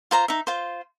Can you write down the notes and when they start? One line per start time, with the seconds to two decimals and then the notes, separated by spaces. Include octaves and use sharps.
0.11 F4 C5 A#5
0.28 D#4 E5
0.47 F4 C5